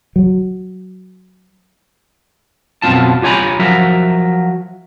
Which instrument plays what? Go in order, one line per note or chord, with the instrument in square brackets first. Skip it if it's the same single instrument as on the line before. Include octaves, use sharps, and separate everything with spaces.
[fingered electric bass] F#3
[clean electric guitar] F#2 B2 C4 F4 A5
F4 G4 C#5 G#5 A#5 B5
F3 F#3 A#4 E5